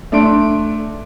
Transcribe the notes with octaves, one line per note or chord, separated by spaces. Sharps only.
A3 D4 C6 D7